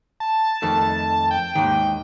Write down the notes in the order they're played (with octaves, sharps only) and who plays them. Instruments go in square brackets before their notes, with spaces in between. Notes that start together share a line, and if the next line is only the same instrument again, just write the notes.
[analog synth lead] A5
[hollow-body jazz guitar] F2 D#3 A3
[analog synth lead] G5
[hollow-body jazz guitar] D#2 G#2 D#3